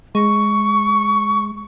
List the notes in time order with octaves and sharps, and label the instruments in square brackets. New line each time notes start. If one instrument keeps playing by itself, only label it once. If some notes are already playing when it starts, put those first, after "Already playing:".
[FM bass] G#3 [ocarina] C#6